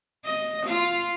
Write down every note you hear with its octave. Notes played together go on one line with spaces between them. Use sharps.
D#5
F4